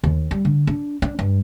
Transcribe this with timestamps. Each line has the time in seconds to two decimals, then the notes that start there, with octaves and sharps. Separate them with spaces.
0.04 D#2
0.31 G3
0.45 D3
0.67 D4
1.02 D4
1.19 G2